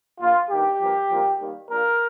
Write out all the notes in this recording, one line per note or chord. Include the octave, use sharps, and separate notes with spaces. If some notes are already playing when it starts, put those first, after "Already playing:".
A#1 A#2 A#3 F4
G2 D#3 A#3 G4
G2 F3 A#3
C2 A#2 F3 A#3
D#2 D#3 G3 A#3
A#1 A#2 A#3 A#4